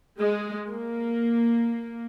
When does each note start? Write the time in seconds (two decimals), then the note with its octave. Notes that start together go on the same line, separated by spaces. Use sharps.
0.19 G#3
0.69 A#3